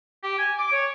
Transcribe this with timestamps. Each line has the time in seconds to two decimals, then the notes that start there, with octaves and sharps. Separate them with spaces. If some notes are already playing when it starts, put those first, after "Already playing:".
0.23 G4
0.39 G#5
0.58 D6
0.72 C#5